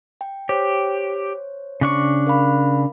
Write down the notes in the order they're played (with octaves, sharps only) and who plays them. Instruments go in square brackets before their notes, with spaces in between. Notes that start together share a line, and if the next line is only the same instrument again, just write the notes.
[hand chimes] G5
[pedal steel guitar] G4 [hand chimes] C5 C#5
[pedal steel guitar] C#3 D4 C#6
[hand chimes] A#4 F5 B5